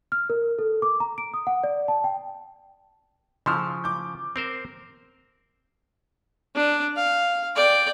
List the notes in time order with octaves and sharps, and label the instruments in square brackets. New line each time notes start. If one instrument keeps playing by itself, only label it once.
[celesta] F6
A#4
A4
D6
A#5
D7
D#6
F#5
D5
A5
G5
[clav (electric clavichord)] C#3 F3 [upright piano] C6 E6 F6
[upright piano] D6 G6
[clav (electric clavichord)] C4 A#4 C5
[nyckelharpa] D4
F5
D5 G5